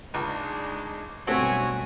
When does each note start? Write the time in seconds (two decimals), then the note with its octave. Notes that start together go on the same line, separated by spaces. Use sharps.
0.14 C#2 G#3 D4 D#4
1.27 B1 G2 B2 A3 C4 F#4 C#5 G#5